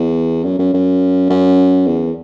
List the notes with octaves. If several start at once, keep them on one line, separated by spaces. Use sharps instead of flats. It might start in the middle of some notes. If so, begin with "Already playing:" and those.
Already playing: E2
F#2
F#2
F#2
F#2
E2